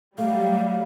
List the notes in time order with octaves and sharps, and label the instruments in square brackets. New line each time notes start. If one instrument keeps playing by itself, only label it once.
[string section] F#3 G3 [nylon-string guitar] A3 [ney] F5